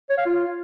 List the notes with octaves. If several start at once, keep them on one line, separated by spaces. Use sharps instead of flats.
C#5
F5
F4